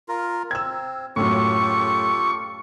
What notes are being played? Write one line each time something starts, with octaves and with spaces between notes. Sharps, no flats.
F4 A#4
C4 E6 G#6
F#2 A2 F4 G4 A4 C#6